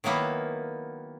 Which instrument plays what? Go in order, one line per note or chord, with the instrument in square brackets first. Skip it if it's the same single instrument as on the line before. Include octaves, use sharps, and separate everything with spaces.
[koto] D#3 F#3 A#3 B3 E4